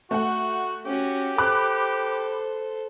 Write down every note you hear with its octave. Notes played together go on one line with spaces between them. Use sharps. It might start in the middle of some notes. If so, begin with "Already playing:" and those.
A3 F#4 F#5
C#4 F#4 G4
A4 C5 B5 D6 F#6